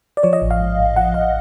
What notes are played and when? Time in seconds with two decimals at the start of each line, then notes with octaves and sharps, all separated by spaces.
0.17 D5
0.23 F3 C#5
0.33 D#5
0.42 A1
0.51 F5
0.60 G#2
0.79 A1
0.96 F3 F#5
1.14 A1 F5